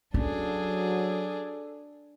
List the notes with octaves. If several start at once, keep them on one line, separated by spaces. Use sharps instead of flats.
F#3 C#4 D4 G#4 A4